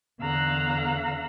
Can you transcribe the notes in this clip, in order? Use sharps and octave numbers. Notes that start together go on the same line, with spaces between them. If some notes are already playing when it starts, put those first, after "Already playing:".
E2 D3 F5 A#5 E6 F#6